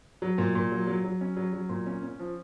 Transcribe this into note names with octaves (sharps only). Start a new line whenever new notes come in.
F#3
A#2
A#2
F#3
F#3
F#3
C#4
F#3
F#3
A#2
C#4
C#4
F3